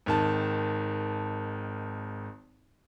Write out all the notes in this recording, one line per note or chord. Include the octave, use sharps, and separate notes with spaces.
G#1 D#3 A5